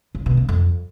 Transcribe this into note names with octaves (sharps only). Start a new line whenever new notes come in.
C#3
B2
C#3
F2